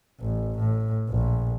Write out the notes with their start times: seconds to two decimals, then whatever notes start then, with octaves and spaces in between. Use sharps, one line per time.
0.20 A1
0.59 A2
1.10 A#1